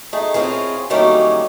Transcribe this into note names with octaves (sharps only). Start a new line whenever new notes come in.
A3 D#4 G#4
C4 C#4 E4 F4 G#4
D#3 F#3 G3 A3 A#3 C#4